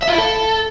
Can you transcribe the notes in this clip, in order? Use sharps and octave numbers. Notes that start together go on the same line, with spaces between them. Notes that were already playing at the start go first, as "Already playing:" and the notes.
E5
F4
E4
A4